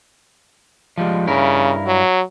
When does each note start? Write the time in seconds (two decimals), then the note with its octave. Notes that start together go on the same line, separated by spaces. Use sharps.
0.98 F3 G3 G#3
1.27 G2 C#3 E4 A#4
1.86 F#3